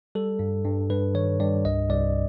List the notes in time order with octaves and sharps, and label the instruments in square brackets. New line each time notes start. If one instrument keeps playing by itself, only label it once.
[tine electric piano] G3 A4
G2
G2
G2 B4
D#3 C#5
G2 D5
C2 D#5
C2 D5